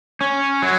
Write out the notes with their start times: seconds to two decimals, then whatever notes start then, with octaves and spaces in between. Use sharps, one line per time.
0.21 C#4
0.62 F#3